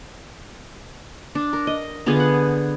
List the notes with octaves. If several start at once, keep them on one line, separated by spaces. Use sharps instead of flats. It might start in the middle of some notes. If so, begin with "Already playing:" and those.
D4
A#4
D#5
D3 B3 F4 G#4
F#5